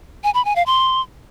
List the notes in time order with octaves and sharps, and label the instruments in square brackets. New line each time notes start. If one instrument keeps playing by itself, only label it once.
[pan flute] G#5
B5
G#5
F5
C6